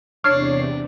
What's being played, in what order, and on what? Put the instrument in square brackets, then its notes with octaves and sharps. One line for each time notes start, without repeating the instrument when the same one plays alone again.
[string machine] E2 C3 [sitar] D4 [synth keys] C#5 C7 [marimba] F6